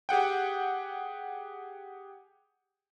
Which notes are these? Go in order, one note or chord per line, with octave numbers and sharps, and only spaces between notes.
G4 G#4 F#5 G5